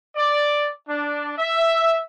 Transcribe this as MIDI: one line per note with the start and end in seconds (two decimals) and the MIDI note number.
0.16 0.69 74
0.88 1.32 62
1.38 2.00 76